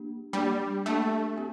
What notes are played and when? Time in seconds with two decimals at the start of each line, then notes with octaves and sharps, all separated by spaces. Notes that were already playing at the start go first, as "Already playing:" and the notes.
Already playing: A#3 D4 G4
0.33 G3 A#3 D4 G4
0.86 A3 A#3 D4 G4
1.37 C4 G4